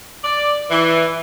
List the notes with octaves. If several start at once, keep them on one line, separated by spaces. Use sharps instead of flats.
D5
E3